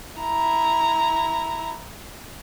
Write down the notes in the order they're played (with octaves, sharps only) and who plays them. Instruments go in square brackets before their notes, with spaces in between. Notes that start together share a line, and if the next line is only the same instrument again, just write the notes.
[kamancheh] E4 A#5